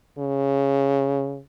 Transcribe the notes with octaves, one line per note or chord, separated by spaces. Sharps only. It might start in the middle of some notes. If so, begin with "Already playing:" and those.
C#3